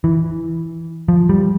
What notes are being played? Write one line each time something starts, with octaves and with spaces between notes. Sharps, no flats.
E3
F3
G3